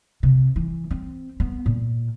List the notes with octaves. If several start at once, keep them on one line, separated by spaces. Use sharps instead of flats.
C3
E3
C4
B3
A#2